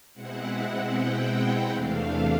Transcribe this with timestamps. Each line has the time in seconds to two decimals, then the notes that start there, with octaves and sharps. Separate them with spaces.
0.13 B2 G#3 C4 E4 F#5
0.92 G5
1.31 F#5
1.71 E2 C3 E3 A3 D4 F5